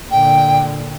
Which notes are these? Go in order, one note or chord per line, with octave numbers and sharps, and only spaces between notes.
A#2 D3 G5